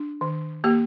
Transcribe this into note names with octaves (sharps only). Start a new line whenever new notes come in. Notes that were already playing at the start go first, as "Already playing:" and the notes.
Already playing: D4
D#3
A#3 G4